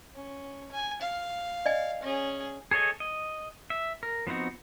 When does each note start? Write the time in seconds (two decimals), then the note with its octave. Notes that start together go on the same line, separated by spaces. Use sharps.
0.15 C#4
0.72 G#5
1.02 F5
1.66 D5 D#5 G#5
2.03 C#4 G#4
2.71 G#4 A4 C#5 D#5 G#5
3.00 D#5
3.70 E5
4.03 A#4
4.27 F3 B3 C4 D#4 F#4